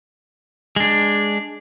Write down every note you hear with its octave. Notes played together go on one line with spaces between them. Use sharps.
G#3 D4